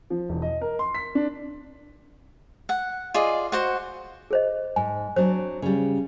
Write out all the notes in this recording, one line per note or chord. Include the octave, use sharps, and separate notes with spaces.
F3
E1
D#5
A#4
C6
B6
D4
F#5
F4 G#4 D5 D#5
F#4 C5 F#5
G#4 C5 D#5
G#2 G#5
F#3 C4 D4 C5
C#3 G3